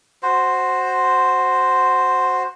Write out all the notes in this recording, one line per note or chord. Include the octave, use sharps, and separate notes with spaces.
F#4 C5